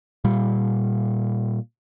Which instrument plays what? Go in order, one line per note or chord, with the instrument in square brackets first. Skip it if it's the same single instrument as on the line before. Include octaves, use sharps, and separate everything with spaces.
[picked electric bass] A#2 G3